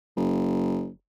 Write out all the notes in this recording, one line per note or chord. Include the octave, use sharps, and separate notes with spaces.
F#1